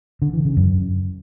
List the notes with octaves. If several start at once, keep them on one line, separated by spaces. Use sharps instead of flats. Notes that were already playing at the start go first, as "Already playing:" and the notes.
D3
E3
C#3
F#2